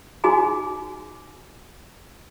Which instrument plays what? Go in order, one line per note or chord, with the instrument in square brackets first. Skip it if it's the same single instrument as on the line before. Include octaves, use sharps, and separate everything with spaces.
[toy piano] D#4 F#4 G#4 G#5 A#5